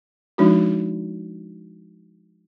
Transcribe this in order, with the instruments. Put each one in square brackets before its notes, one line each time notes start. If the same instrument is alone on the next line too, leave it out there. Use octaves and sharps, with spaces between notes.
[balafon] F3 G#3 D4 D#4 F#4